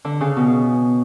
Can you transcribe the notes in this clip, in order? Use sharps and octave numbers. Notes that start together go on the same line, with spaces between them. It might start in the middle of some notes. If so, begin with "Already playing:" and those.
D3
C#3
B2